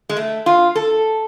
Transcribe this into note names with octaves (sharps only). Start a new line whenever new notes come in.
G#3
A3
F4
A4